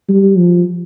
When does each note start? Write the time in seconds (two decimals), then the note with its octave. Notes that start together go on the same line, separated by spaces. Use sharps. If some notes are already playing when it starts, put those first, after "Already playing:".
0.09 G3
0.38 F3